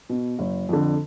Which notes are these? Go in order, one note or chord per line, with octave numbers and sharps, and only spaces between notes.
B2
F#1
F2 D3